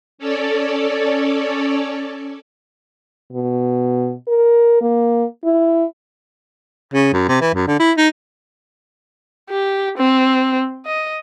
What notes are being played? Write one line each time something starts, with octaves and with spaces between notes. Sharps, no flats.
C#4 A4 C#5 D5
B2
A#4
A#3
E4
C#3
F#2
C3
E3
F#2
D3
E4
D#4
G4
C4
D#5